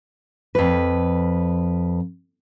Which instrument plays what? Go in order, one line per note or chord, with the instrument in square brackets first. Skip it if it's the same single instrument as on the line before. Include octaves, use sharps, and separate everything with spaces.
[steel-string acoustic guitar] F2 B4